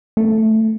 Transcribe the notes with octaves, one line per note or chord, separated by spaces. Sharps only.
A3